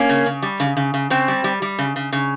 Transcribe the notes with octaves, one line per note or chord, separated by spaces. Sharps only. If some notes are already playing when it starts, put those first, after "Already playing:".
Already playing: A#3 C#4
C#3
C#3
G3
C#3
C#3
C#3
C#3 C4
G3
G3
G3
C#3
C#3
C#3